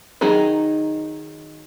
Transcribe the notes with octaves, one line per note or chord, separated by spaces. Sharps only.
D#3 F#3 D#4 G#4